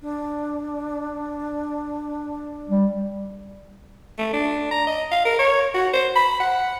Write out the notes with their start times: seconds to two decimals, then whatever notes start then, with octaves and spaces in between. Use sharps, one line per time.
0.01 D4
2.69 G3
4.18 A3
4.33 D4
4.71 A#5
4.87 D#5
5.11 F5
5.25 A#4
5.39 C#5
5.74 F#4
5.93 C5
6.16 B5
6.40 F#5